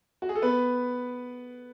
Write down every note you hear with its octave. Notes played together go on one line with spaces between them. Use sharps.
F#4
G#4
A4
B3 B4